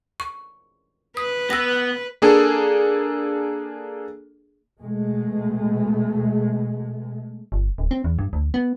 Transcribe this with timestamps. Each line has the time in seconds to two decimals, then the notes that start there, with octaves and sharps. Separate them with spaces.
0.20 C#6
1.17 B4 D#6
1.50 B3 E6 A#6
2.22 A#3 D4 G#4 A4
4.80 B2 G#3 A3
7.52 G1
7.78 D1
7.91 C4
8.04 E2
8.19 G2
8.33 D2
8.54 B3